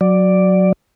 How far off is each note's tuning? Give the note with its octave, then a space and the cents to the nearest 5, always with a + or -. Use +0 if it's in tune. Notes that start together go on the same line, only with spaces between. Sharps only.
F#3 -5 D5 +0